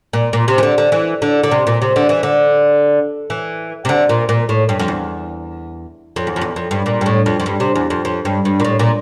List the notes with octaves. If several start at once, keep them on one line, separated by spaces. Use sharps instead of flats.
A#2
A#2
C3
E3
D3
D3
E3
D3
D3
C3
A#2
C3
D3
E3
D3
E3
C3
D3
A#2
A#2
A2
G2
F2
E2
F2
E2
F2
E2
F2
G2
A#2
G2
A2
F2
F2
G2
C3
E2
F2
F2
G2
G2
A#2
A2
A#2